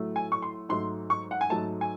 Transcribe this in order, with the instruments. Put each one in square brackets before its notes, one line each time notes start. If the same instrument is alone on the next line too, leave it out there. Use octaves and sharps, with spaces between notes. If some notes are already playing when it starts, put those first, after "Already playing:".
Already playing: [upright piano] A2 F#3 A3
G#5
C#6
C6
G#2 F#3 A3 C6
C#6
F#5
G#5
G#2 F#3 A3 A5
G#5